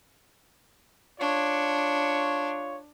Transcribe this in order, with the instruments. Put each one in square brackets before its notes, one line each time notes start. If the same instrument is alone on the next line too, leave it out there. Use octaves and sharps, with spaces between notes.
[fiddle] D4 [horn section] F4 C#5